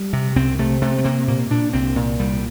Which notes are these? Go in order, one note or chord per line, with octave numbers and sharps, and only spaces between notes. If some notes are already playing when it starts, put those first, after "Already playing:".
Already playing: G3
C3
C2 C4
C3 A3
C3 A3
A3
C3 A#3
A#2 A#3
A#2 D4
C2 C4
A#2
C2 G3